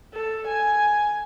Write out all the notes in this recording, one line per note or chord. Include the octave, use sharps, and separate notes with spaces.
A4
G#5